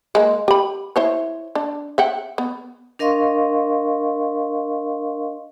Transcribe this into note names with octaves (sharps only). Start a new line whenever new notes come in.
G#3 A#3
G4 B5
E4 C5 C#5
D4
E5 F#5 G5
B3
D4 A#4 D#5 F5 C6 C#6